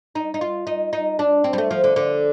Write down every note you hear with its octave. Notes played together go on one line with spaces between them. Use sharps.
D#4
D#4
F4
D#4
D#4
D4
C4
G3
A3
F3
D3
D3